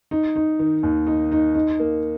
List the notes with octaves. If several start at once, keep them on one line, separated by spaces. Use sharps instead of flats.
D#4
D#4
D#3
D#2
D#4
D#4
D#4
A#3